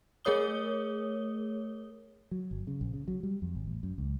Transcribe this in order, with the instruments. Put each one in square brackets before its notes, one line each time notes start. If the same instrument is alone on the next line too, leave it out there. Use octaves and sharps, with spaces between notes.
[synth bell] A3 G#4 A#4 C#5 D#6 G7
[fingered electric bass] F#3
G1
C#3
A#1
C#3
F#3
G3
F2
G#1
A1
F#2
C#2